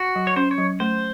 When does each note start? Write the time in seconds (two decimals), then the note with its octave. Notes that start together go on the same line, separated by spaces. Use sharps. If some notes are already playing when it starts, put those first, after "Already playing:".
Already playing: F#4
0.16 F#3
0.27 C#5
0.36 C#4 C5
0.51 C#5
0.58 F#3
0.80 A3 C5